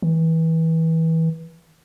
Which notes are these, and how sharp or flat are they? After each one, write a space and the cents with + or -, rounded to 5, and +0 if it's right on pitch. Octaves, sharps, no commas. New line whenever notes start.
E3 -25